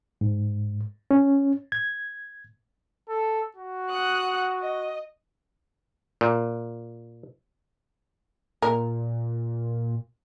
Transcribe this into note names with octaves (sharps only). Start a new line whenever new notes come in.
G#2
C#4
G#6
A4
F#4
F#5 D#6 F#6
D#5
A#2
A#2 A#4